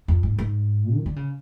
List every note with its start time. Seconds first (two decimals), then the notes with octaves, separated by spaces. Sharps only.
0.08 F2
0.23 G#2
0.38 G#2
0.94 D#3
1.06 D3
1.16 C#3